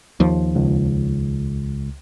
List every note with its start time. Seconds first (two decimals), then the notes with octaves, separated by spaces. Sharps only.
0.20 D#2 F3
0.55 C#2